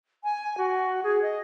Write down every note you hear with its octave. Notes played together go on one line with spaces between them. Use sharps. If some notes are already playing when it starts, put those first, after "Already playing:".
G#5
F#4
G#4
D#5